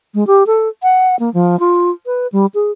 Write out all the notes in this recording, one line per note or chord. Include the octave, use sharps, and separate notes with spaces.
G#3
G4
A4
F#5
A#3
F3
F4
B4
G3
G#4